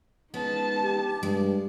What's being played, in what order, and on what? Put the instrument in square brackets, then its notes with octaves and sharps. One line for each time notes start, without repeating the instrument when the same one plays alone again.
[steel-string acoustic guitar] G#3 B3 C#4 [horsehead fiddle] D#4 A5
[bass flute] G4
[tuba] G2 [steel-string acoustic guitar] G#3